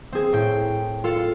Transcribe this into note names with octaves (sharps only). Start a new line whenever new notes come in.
C4 G#4
A2 G5
F4 A4